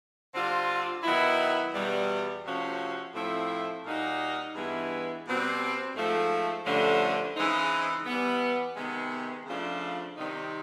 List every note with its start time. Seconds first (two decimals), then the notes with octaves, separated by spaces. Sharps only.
0.33 D3 G3 C4 F4
1.03 D#3 F#3 B3 E4
1.74 E2 B2 G3
2.44 C3 F3 A3 C#4 F#4
3.14 A2 F3 A3 C4 E4
3.85 A#2 G3 A#3 D#4 F#4
4.54 G2 E3 G#3 B3 E4
5.25 B2 G3 C4
5.95 G#2 F3 A3
6.65 G2 D3 F3 A3 C#4
7.35 C#3 E3 G#3 C4 D#4
8.06 E3 G3 B3
8.76 C3 D#3 G#3 B3
9.46 C#3 F3 A3 D4 F4
10.17 C3 D#3 G3 C4 D#4